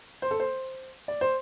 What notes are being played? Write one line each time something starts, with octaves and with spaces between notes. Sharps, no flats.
C5
A4
C5
D5
C5